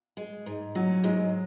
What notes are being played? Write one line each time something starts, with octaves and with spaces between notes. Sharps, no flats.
G#3
G#2
F#3 C#4
G#2 G#3